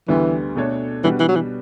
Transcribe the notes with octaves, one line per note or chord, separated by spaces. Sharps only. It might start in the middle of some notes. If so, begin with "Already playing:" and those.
D2 D3 E3 G3 B3
B2 A3 D4 A4 C#5
B2 E3 G3 D4 F#4 B4
E3
F#3
E3